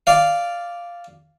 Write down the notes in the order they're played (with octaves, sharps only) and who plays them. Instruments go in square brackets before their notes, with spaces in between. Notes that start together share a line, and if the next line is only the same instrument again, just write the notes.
[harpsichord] D5 F5